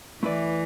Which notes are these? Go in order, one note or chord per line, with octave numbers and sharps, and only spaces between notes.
E3 A3 E4 B4 D5